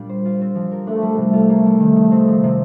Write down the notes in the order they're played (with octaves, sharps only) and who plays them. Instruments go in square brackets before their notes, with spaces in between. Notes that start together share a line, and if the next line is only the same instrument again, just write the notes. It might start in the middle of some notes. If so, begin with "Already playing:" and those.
Already playing: [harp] A#2 G3 D4 F4 G4
C5
F4
C4
F3
A#4
[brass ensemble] A3 [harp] D4
[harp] G3
[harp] C3 [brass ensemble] A3
[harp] F4
A#3
G3
D#3
D#4
C4
F3
C3